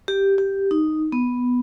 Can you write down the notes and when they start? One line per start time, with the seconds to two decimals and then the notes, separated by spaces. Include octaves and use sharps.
0.08 G4
0.38 G4
0.71 D#4
1.12 B3